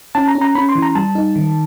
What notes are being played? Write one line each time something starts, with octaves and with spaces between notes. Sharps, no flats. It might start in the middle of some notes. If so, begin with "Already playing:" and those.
C#4 A5
A#5
C#4
A#5
C#4 B5
C6
E3
A#5
G3 A5
D#4
D#3